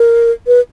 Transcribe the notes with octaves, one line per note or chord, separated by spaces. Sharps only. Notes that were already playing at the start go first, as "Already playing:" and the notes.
Already playing: A#4
B4